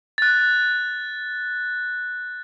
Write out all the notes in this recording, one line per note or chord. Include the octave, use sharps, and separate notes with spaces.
F#6 A6